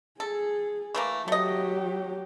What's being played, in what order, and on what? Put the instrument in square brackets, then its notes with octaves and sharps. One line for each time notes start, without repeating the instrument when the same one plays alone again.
[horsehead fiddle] G#4 [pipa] A4
[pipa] E3 A3 A#3
[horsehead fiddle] F#3 G4 [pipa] A3 D#5